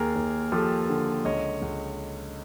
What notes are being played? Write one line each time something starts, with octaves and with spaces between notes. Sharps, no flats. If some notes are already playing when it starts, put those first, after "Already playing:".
Already playing: D#2 G#4 A#4
D#2
F3 G4 A4
D3
C#2 C#5 D#5
C#2